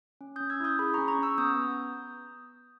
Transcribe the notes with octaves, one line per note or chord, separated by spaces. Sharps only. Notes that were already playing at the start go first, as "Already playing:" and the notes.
C#4
C#4 D#6 G6
E6 G#6
E4 D#6 G6
G#4 B5 D#6
C#4 A#5 C#6
A#5 C#6
C#4 C#6 E6
B3 D#6 G6
B3